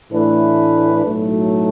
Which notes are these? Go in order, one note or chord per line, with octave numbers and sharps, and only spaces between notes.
A2 E3 A3 D4 B4
B1 A2 F#3 A3